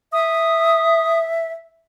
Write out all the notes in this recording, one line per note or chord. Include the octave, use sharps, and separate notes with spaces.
E5 D#6